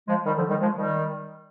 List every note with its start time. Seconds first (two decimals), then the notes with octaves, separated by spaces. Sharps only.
0.08 F3 G#3
0.25 D#3 G3
0.37 D3 F3
0.49 D#3 G3
0.61 F3 G#3
0.78 D#3 G3